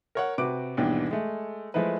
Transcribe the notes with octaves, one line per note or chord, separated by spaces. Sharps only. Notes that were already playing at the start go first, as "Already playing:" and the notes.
A#4 C#5 F#5
C3 F#4 B4 D6 D7
D#2 G#2 B2 E3 G3 D4
G#3 A3
F3 G#3 A3 E4 B4